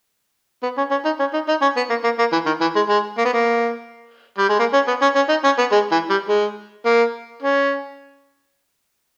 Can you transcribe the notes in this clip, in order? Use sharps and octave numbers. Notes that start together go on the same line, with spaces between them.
B3
C#4
C#4
D#4
C#4
D#4
D#4
C#4
B3
A#3
A#3
A#3
E3
D#3
E3
G#3
G#3
A#3
B3
A#3
G3
G#3
A#3
C#4
B3
C#4
C#4
D#4
C#4
B3
G#3
E3
G3
G#3
A#3
C#4